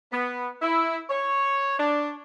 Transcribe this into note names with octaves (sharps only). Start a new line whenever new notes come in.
B3
E4
C#5
D4